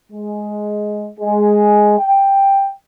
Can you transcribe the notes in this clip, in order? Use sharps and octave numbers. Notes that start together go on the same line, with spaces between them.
G#3
G#3
G5